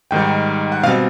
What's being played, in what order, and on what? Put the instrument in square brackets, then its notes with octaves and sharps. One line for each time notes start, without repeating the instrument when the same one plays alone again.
[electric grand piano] G#2 D#3 G3 G5
F#5
B2 G3 C4 F5